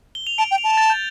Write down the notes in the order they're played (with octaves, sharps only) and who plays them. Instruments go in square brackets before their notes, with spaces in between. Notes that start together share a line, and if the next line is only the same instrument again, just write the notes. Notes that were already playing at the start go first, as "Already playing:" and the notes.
[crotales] G7
F7
[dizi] A5 [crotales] D7
[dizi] G5
[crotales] F7
[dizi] A5
[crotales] A6
G6